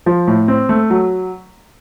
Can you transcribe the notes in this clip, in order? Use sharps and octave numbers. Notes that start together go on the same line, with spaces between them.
F3
A2
C4
A3
F#3